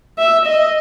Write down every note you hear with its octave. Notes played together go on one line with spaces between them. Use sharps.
E5
D#5